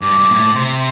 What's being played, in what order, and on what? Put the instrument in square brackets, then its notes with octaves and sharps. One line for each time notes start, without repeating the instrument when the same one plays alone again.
[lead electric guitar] G2 [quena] D6
[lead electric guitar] G2
A#2
A2
[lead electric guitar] C3 [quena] C6